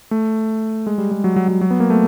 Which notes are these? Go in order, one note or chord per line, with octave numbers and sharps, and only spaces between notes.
A3
G#3
G3
G#3
F#3
F#3
F#3
F#3
B3
A#3
A3